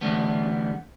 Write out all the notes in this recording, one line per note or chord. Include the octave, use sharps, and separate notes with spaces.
D3 E3 G3 A3 B3